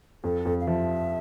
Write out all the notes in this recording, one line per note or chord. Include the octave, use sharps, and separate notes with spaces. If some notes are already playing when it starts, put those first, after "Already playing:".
F2 A4
F2
F5
F3 E5